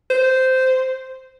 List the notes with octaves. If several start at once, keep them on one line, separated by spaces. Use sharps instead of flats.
C5